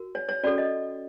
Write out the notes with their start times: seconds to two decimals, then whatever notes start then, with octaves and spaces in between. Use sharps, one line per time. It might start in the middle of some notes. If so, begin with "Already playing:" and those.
Already playing: F#4 A#4
0.15 C#5
0.29 C#5
0.43 C#4 F#4 A4 D5
0.58 D#5